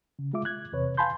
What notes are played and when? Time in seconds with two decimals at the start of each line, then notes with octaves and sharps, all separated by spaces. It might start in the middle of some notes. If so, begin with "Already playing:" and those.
0.19 C#3
0.33 G#3 F4 E5 D6
0.45 F#6 G#6
0.72 E2 C3 B4 C#5
0.97 F5 G#5 A5 B5 C6 G6